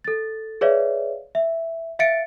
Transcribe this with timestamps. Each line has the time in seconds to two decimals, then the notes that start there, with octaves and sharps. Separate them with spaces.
0.04 A4 A6
0.61 G#4 B4 C#5 D5 E5 F5
1.35 E5
1.99 E5 F5 A6 C#7 D7